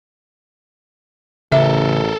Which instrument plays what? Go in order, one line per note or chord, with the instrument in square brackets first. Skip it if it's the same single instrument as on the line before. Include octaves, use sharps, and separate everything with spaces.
[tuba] A1 [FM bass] C#3 [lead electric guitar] A4 A#4 [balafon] E5